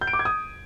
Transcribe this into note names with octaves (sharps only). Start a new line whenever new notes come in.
G6
D7
D6
G#6
D#6